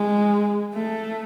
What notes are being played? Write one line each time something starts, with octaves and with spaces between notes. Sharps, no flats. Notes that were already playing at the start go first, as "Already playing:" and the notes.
Already playing: G#3
A3